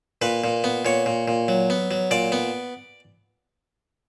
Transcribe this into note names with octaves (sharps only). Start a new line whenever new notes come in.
A#2 B4
A#2
B3
A#2 C#5
A#2
A#2
F#3
B3
F#3
A#2 D5
B3